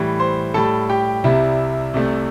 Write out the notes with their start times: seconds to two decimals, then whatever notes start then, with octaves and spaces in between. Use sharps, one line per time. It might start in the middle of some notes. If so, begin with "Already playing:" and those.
Already playing: A2 E3 G3
0.20 C5 C6
0.54 A2 G3 A4 A5
0.90 G4 G5
1.24 C2 C3 G3 E4 E5
1.94 C2 C3 A3